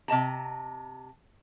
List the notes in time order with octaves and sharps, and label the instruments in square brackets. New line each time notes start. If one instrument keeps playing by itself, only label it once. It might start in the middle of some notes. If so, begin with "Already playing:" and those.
[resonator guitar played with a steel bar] C3 D#5 A5 A#5